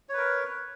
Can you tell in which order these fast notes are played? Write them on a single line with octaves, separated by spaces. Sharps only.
C#5 B4 A#4